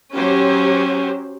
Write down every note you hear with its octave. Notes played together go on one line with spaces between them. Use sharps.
F#3 C#4 G4 C5